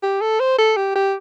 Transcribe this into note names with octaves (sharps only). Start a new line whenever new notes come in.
G4
A4
C5
A4
G4
G4